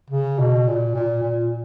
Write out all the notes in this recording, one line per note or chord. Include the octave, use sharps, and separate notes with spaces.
C#3
B2
A#2
A#2
A#2